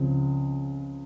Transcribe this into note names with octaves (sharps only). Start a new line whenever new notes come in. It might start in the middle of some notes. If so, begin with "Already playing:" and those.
Already playing: C#2 C#3 F3 C4